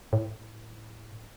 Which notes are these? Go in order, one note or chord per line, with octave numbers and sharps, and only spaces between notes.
A2